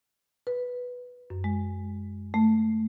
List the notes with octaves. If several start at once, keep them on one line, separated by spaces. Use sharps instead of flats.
B4
F#2
G#3
A3